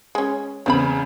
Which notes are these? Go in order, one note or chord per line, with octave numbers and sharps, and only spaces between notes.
G#3 C#4
E2 C#3 G#3 C4 F5 B5